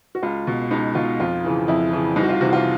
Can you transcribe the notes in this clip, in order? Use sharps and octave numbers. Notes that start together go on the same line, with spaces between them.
F#4
C#2 F4
B2
C#2 D#4
B2 F4
F2 F4
C#3 E3
F2 E4
C#3 E3
C2 D#4
F#4
F4
C3 E3 F#4
F4